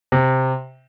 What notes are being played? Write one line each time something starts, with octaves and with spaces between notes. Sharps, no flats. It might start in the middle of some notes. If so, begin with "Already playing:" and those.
C3